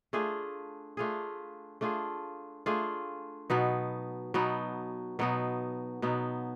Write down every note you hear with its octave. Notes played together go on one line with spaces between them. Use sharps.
A3 D4 F4 G#4
A3 D4 F4 G#4
A3 D4 F4 G#4
A3 D4 F4 G#4
B2 F#3 B3 D#4
B2 F#3 B3 D#4
B2 F#3 B3 D#4
B2 F#3 B3 D#4